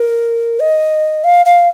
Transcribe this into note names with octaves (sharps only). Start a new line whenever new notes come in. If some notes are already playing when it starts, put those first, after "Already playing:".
Already playing: A#4
D#5
F5
F5